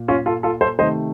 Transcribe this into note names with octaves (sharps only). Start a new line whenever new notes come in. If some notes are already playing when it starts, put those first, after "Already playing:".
Already playing: A#2
C#4 F4
F4 A4
F4 A4
A4 C5
C3 D#3 A3 C5 D#5